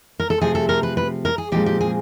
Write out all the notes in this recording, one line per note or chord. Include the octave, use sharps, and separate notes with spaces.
A#4
A4
C3 F3 A3 C4 G#4
A4
A#4
B4
B4
A#4
G#4
A#2 F3 G#3 C4 G4
G4
G#4